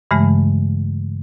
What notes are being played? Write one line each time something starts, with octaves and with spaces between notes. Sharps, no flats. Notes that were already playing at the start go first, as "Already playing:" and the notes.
G2 C#3 E3 G#3 A3